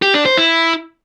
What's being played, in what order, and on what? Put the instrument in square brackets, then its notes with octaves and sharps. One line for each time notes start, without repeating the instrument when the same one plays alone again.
[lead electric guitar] G4
D4
C5
E4